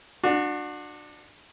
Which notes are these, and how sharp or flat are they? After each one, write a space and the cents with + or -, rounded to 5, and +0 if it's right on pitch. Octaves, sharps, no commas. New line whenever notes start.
D4 +20 F#4 -25